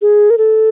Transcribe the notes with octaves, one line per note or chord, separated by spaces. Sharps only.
G#4
A#4
A4